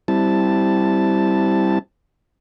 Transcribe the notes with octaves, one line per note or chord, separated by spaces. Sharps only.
G3 C4 E4 A5